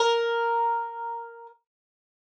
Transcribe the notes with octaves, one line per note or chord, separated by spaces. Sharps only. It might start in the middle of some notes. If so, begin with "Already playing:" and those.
Already playing: A#4